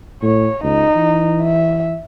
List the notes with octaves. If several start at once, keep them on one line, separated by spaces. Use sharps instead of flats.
A2 C#5
C#2 D#4
E3
E5